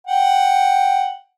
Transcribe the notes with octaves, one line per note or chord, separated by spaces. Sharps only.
F#5 G5